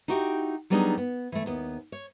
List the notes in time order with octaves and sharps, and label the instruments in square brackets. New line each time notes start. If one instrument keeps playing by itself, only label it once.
[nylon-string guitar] D#4 E4 F#4 G4 G5
F#3 G3 B3 D4 D#4 G#4
B3
E3 A3
D#2 B3
C#5